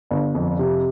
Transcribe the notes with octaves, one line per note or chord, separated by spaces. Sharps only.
G1
F2
C3